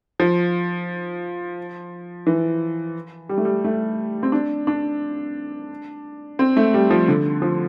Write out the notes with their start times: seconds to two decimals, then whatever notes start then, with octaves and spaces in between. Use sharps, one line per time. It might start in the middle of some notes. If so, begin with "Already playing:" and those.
0.20 F3
2.27 E3
3.29 G3
3.38 A3
3.45 G3
3.64 A3
4.23 C4
4.32 D4
4.67 D4
6.39 C4
6.57 A3
6.74 G3
6.90 F3
7.08 D3
7.42 F3